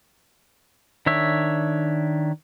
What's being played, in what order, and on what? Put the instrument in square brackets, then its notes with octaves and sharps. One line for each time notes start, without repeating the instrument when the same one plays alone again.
[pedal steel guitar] D#3 D4 C#5 E5